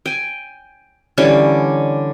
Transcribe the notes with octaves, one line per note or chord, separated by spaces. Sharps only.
G5 G#5
D3 E3 G3 C#4